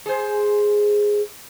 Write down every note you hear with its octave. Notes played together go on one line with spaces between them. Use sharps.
G#4 C5